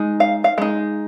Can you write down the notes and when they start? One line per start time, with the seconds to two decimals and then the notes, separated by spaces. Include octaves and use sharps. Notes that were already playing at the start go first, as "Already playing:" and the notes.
Already playing: G#3 D#4
0.20 F5
0.44 F5
0.58 G#3 D#4